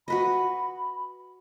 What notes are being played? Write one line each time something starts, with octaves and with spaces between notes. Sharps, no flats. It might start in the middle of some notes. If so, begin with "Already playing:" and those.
F#4 B4 D#5 B5